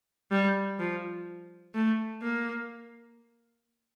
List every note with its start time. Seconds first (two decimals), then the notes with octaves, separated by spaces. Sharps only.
0.31 G3
0.79 F3
1.75 A3
2.22 A#3